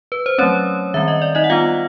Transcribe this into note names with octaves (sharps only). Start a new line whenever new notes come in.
B4
C5
F#3 A3 C4 C#4 C#5
D#3 G3 C4 E5
D#5
D5
D#4 D#5
F#5
G3 B3 D4 F4 F5